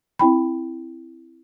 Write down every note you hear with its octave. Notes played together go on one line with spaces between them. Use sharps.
C4 E4 G5 B5